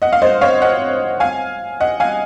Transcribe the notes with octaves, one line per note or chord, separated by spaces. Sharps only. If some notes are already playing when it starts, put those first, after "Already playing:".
D#5 F#5
F5
C5 D#5
C#5 F5
D#5 F#5
F5 G#5
D#5 F#5
F5 G#5